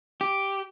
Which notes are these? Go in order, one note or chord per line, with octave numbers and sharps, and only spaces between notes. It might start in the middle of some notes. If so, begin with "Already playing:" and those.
G4